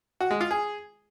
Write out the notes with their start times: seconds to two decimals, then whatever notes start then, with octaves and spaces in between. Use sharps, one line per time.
0.20 F#4
0.31 G#3
0.41 F4
0.51 G#4